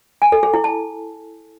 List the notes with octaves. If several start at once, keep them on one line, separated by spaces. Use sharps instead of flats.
G#5
A4
G#4
E4
A5